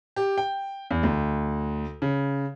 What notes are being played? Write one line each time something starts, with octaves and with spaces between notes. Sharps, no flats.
G4
G5
E2
D2
C#3